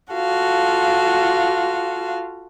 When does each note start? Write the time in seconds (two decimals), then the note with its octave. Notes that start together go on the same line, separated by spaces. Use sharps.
0.12 F4 F#4 A4 F5